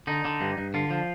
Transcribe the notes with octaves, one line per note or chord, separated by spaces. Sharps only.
D3 D#4
D3
G2
G2
D3 F4
F3